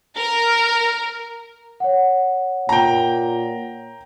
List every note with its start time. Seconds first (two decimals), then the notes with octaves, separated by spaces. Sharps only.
0.16 A#4
1.80 C#5 F#5
2.69 A#2 G5 A#5